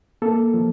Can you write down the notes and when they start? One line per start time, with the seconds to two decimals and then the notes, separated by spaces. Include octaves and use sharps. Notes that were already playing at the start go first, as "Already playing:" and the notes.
0.22 A#3 A4
0.54 F3